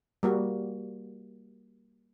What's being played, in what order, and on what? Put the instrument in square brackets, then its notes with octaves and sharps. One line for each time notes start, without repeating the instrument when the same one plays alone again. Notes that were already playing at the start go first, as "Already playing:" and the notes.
[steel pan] G3 A#3 F#4